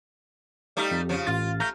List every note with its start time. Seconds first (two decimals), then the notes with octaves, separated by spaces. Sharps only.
0.77 G3 A3 D#4
0.91 F2
1.09 C#3 F3
1.27 A1 F4 A6
1.60 A3 A#5 F6 G6